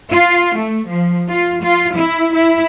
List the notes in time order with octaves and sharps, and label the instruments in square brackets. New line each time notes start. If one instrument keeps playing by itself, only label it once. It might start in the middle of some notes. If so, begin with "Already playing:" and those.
[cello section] F4
A3
F3
F4
F4
E4
E4